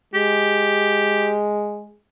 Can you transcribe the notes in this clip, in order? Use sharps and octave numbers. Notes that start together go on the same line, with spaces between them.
G#3 G4